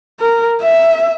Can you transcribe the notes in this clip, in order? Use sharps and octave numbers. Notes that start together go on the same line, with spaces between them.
A#4
E5